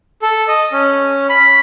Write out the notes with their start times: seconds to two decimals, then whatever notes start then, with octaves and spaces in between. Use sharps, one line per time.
0.22 A4
0.48 D#5
0.72 C#4
1.29 B5